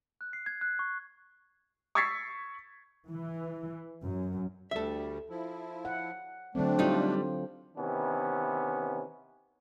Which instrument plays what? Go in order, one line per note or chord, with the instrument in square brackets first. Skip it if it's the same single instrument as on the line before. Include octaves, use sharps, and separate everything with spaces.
[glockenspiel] F#6
C7
G#6
F#6
C#6
[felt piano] C#6 E6 G#6 A6 B6 C7
[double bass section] E3
F#2
[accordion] D2 G3 [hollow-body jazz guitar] A4 E5
[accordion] F3 E4
[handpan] F#5
[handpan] D3 F#3 C4 [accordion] A3 D4
[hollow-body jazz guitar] G3 D#4 [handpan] F4 A4
[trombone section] C3 D#3 E3 B3 C#4